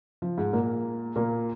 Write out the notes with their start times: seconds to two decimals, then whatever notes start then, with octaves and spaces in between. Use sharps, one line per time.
0.22 F3
0.37 G#2 G#3
0.53 A#2 A#3
1.16 A#2 A#3